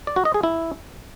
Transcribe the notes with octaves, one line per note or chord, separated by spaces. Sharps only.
D5
F#4
D#5
G#4
E4